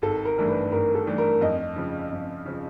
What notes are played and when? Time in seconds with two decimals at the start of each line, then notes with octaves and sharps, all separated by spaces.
0.02 G#1 A4
0.25 A#4
0.38 G2 E3 A3 D4
0.48 B4
0.72 G#1 A#4
0.95 A4
1.07 G2 E3 A3 D4
1.18 A#4
1.41 F2 D#5
1.76 C#3 F3
2.11 F2
2.46 C#3 F3